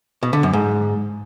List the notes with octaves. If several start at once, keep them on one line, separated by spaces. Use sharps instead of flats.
B2
D3
F#2
G#2